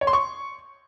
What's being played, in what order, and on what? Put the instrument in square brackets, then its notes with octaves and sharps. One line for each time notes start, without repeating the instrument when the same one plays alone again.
[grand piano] C#5
C6
C#6